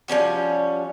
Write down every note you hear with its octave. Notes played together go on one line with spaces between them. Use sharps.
F3 G3 C#4 F#4